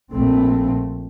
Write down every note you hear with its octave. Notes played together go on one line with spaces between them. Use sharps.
A#1 A#2 A3 C4